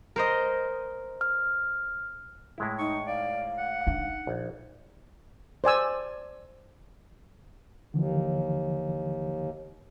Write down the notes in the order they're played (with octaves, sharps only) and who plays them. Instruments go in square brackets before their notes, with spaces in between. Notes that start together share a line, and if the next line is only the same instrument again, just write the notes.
[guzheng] A#4 C5 D#5
[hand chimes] F6
[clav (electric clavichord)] A2 G#3 E4
[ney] D#4 [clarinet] C#6
[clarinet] D5 [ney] F5
[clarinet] F#5
[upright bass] D4 D#4
[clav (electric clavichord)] A#1
[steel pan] C5 D5 G#5 E6
[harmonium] D#2 [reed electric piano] D3 E3 F3